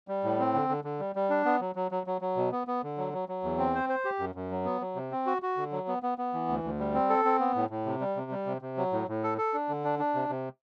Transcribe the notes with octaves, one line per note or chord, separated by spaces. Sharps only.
G3
A2
C4
D3
D3
D3
G3
G3
D4
B3
F#3
F#3
F#3
F#3
F#3
B2
B3
B3
D3
F#3
F#3
F#3
E2
C4
C5
C5
G4
F#2
F#2
F#3
B3
F#3
C3
C4
F#4
F#4
D3
F#3
B3
B3
B3
E3
D2
D2
G3
C4
A4
C4
B3
A2
A2
C3
G3
C3
G3
C3
C3
F#3
A2
A2
A4
A4
D4
D3
D4
D4
C3
C3